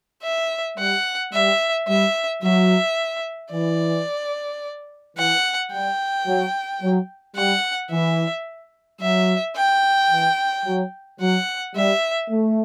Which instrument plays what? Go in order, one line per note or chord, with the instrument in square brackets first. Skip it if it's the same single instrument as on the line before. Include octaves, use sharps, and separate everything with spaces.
[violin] E5
[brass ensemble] G3 [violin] F#5
[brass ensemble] G3 [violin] E5
[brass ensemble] G3 [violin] E5
[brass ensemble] F#3 [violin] E5
[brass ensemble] E3 [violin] D5
[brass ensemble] E3 [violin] F#5
[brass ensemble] G3 [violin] G5
[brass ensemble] F#3
F#3
[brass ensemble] G3 [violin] F#5
[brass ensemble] E3 [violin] E5
[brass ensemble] F#3 [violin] E5
[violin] G5
[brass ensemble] E3
F#3
[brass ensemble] F#3 [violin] F#5
[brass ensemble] G3 [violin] E5
[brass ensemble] A3